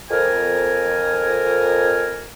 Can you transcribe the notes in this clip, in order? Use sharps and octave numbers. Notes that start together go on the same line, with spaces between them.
F2 A#4 G#5